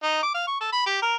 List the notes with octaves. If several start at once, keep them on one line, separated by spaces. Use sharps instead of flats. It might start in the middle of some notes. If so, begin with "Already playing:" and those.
D#4
D6
F5
C#6
A4
B5
G4
A#4